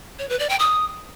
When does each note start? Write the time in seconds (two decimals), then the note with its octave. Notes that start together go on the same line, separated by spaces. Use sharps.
0.19 C#5
0.29 B4
0.39 D5
0.49 G5
0.60 D#6